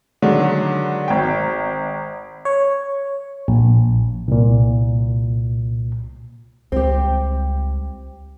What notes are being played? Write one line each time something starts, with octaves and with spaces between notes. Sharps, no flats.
D3 D#3 F#3 G#3
G#1 G5
C#5
A#1
C2 A#2
C#2 G3 G#3 C4 G4